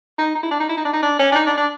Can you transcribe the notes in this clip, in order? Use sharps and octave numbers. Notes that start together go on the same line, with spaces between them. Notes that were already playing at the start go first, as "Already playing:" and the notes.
D#4
D#4
E4
D4
D#4
E4
D#4
D4
D#4
D4
C#4
D4
D#4
D4
D4